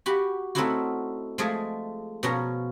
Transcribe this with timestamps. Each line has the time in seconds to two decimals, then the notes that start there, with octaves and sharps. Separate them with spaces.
0.06 F#4 G4 B5
0.55 A3 C4 C#4 D#4 E4 F#4
1.38 F3 G#3 A3 G#4 D#5
2.23 B2 F3 C#4 A#5